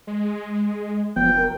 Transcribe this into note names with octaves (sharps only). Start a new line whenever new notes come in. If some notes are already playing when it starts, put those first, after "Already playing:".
G#3
F1 F3 B3 G5
A#4